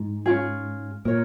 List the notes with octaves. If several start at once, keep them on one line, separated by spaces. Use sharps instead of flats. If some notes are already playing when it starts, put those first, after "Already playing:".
Already playing: G#2
C#4 F4 G#4
A#2 A#4 C#5